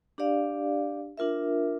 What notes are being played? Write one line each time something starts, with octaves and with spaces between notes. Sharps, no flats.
D4 G4 D5 F5
D4 F4 A#4 E5